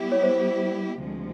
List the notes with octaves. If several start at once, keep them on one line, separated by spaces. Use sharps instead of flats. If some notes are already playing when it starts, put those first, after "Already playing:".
Already playing: G3 B3 E4 G4
C#5
C5
D2 C3 F3 G#3